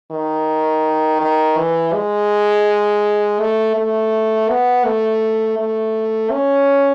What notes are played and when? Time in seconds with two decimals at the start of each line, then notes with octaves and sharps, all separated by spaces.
0.12 D#3
1.21 D#3
1.58 E3
1.94 G#3
3.40 A3
3.77 A3
4.50 B3
4.85 A3
5.59 A3
6.32 C#4